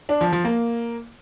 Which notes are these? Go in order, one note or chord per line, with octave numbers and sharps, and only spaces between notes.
D4
F3
F3
A#3